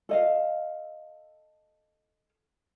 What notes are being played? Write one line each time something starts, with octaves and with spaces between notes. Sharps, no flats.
A4 D#5 F5